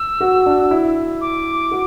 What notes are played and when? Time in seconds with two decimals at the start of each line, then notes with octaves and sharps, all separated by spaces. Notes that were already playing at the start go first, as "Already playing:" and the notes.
Already playing: E6
0.21 F#4
0.46 D4
0.71 E4
1.21 D6
1.71 F#4